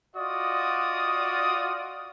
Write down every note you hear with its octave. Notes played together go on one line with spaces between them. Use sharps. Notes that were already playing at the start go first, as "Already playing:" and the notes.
F4 F#4 D5 D#5 D#6